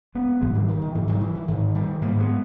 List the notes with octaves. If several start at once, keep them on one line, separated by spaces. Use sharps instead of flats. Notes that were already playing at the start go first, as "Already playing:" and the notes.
G#3 B3
G#2 E3 G#3
D#3 G3
D#3
D#3
G#2 E3
D#3 G3
E3
E3
G#2 D#3
D#3 G3
G#2 G3 A#3
G#3 B3